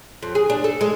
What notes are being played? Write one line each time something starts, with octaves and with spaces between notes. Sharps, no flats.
F2
G#4
D4
A4
G#3